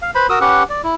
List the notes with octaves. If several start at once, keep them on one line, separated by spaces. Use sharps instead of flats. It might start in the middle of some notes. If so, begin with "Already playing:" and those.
F5
B4 C5 B5
F#4 A#4 D#6 E6
C#4 G4 B4 F#5
D5
E4